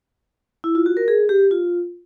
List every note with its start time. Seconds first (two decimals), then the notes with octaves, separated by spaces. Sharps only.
0.64 E4
0.75 F4
0.86 F#4
0.97 A#4
1.08 G#4
1.29 G4
1.51 F4